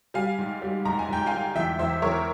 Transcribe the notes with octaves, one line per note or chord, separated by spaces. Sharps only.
G3 F5 G#5
G#2
G3
G#2 A#5
G#5
G#2 G5
F5 G#5
G#2
E2 E5 G5
E2 C5 E5
E2 A#4 C#5